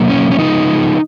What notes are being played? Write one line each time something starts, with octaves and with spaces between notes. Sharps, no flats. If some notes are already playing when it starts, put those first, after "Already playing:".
Already playing: B2 F#3 A#3
C#4
C#4
C#3 F3 G#3 B3 D#4